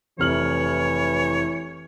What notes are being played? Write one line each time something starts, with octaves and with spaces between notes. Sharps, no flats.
F1 E3 C#5 F6 F#7